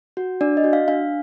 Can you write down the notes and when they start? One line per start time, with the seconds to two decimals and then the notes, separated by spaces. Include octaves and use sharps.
0.17 F#4
0.41 D4 D5
0.57 D#5
0.64 F#4
0.73 F5
0.88 D4 F5